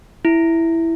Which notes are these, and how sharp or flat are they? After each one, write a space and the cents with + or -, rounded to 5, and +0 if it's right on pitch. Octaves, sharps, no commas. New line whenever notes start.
E4 +0